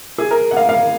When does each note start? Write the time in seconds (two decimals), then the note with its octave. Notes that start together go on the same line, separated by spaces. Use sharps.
0.18 G#4
0.31 A#4
0.51 F#5
0.57 F5
0.69 F5